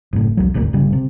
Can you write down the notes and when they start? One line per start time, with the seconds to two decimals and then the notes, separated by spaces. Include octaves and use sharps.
0.13 F#1 A2
0.37 E1 C2 F#3
0.54 D#1 G#1 D2 A#2
0.73 G1 C#3 G3
0.93 C3